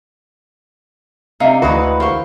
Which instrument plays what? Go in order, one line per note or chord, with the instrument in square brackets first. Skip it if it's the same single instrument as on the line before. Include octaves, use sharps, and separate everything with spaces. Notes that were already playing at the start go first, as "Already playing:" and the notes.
[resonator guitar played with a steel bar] C3 [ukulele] D4 E5 F5 [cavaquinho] D#4
[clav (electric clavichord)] D2 F#4 [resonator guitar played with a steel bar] E3 G#3 B4
[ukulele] A#4 C5 F5 [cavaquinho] C6 C#6